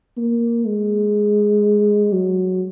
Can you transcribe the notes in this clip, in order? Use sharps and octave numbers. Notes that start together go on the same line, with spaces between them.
A#3
G#3
F#3